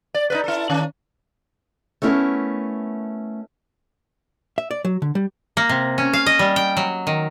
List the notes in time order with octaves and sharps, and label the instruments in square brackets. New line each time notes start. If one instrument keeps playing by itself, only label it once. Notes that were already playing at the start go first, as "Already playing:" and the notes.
[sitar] D5
D#4 A#4 B4
E4 A4
D#3 C#4
[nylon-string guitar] A3 B3 C#4 E4 A#4
[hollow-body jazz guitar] E5
D5
F#3
D3
G3
[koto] A#3
C3
C#4
F5
D#5
G3
G5
F#3
D#3